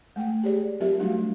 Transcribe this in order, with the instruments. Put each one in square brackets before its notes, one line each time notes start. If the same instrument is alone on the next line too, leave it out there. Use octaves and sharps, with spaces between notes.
[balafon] G#3 A3 G5
G4 G#4 C#5 D5
F#3 C4 F4 G4 A#4 E5
F#3 G3 A3 D4 F#4 F5